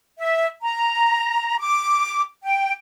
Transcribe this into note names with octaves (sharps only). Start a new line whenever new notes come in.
E5
A#5
D6
G5